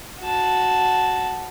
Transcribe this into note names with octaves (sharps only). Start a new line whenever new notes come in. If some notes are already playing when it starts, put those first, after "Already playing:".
F#4 A5